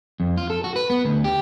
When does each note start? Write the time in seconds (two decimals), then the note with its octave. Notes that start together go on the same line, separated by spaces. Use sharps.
0.20 F2
0.37 F4
0.50 A4
0.64 F#4
0.76 B4
0.90 B3
1.05 D2
1.24 G4